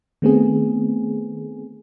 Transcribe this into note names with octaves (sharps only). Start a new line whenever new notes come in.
D#3 A3 B3 C4 G#4